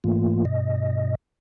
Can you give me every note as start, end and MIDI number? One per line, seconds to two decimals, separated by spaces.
0.04 0.45 44
0.04 0.45 52
0.04 0.45 57
0.04 0.45 58
0.04 0.45 65
0.45 1.15 43
0.45 1.15 47
0.45 1.15 75